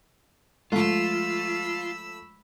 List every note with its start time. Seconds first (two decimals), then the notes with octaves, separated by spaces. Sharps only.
0.72 F3 G#3 A3 F4 B5 E6